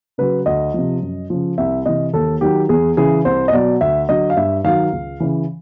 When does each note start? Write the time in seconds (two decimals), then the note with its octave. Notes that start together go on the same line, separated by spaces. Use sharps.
0.18 C#3 F#3 B4
0.46 D2 D#5
0.74 C3 F3
1.02 F#2
1.30 C#3 F3
1.58 C2 E5
1.86 C3 E3 D#5
2.13 D#2 A4
2.41 D#3 F#3 G4
2.69 E2 G#4
2.97 C#3 E3 G#4
3.25 C2 C5
3.48 D#5
3.53 B2 F#3 D5
3.81 D2 E5
4.09 D3 F#3 D#5
4.30 F5
4.37 G2 E5
4.64 D#3 F#3 F5
4.92 C#2
5.20 C#3 E3